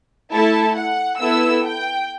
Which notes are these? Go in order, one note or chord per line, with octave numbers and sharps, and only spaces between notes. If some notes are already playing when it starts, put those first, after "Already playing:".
A3 E4 A4 A5
F#5
B3 E4 A4 E6
G5